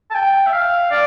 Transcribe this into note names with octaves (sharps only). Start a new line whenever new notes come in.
A5
G5
E5
F5
D5